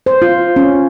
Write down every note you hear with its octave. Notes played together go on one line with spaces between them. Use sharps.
C5
F4
C#4